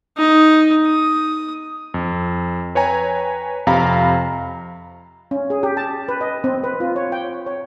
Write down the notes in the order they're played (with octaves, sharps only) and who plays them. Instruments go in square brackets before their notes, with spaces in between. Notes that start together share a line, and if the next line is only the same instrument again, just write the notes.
[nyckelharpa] D#4
D#6
[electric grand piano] F2
B4 C#5 G5 G#5 A#5
F2 C3 F5 A#5 B5
[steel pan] C#4
G#4
G4
A5
B4
D#5
C4
B4
F4
C#5
G5
C#5